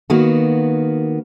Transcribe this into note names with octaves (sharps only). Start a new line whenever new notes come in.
D#3 A#3 B3 F#4